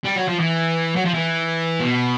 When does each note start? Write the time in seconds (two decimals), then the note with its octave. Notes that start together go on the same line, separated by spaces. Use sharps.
0.05 G3
0.16 F#3
0.28 F3
0.39 E3
0.96 F#3
1.05 F3
1.14 E3
1.80 B2